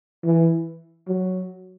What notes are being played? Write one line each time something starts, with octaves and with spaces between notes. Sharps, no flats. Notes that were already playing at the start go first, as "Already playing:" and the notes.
E3
F#3